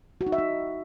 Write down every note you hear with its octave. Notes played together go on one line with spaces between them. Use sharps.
F#4
D#4
E5
D#4